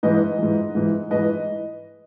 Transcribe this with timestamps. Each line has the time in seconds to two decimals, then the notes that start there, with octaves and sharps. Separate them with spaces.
0.03 G#2 E3 B4 D#5
0.39 G#2 E3
0.75 G#2 E3
1.11 G#2 E3 B4 D#5